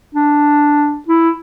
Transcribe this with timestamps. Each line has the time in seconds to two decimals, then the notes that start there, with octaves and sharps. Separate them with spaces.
0.15 D4
1.09 E4